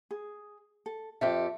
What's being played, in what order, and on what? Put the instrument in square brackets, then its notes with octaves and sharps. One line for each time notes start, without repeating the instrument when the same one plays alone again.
[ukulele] G#4
A4
[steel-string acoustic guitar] F2 G4 A4 [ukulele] E5